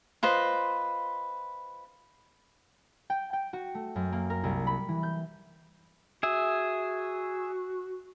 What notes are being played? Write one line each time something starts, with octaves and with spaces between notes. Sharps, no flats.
F4 B4 C5 D#5
G5
G5
F#4
A3
F#2
A#3
A#4
C2
B5
E3
G6
F#4 G#4 E5